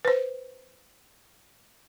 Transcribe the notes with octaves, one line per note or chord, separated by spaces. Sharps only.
B4 C5